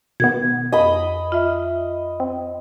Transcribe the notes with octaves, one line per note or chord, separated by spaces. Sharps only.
B2 D#3 B3 G#6
F2 D#5 B5
F4 E5
C4